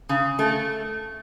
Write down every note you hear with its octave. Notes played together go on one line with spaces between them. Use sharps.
C#3
A3